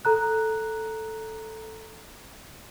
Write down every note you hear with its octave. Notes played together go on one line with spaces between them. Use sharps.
A4 A#5 F#6